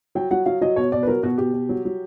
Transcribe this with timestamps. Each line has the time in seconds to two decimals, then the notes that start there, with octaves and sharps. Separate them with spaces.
0.15 F#3 G5
0.31 F#3 F#5
0.46 F#3 F5
0.61 F#3 D#5
0.76 B2 C#5
0.92 B2 D5
1.03 B4
1.07 F#3 A#4
1.23 B2 F#4
1.38 B2 G4
1.54 B2
1.69 F#3
1.85 F#3